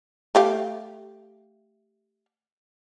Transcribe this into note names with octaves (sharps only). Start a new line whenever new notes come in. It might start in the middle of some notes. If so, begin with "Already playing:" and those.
A3 G4 F5